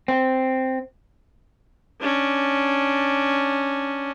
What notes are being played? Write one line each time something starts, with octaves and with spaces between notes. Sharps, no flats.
C4
C#4 D4